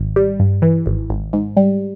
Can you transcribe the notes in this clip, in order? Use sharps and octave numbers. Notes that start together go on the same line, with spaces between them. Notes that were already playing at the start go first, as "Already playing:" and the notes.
Already playing: G#1
G3
G2
E3
G#1
G#1
G#2
G3